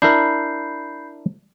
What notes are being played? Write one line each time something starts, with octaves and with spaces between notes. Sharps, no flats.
D4 E4 A#4 B5 G6 C7